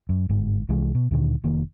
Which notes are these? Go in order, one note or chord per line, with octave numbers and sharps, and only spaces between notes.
F#2
G1 G#2
C2 E3 G#3
B2
D2 A#2 D3 D#3
F1 D#3 A#3